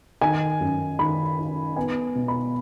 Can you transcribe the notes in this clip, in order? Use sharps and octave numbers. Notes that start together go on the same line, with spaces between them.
D#3 G#5
F#2
D#3 B5
D#4
B3 G#5
B2
B5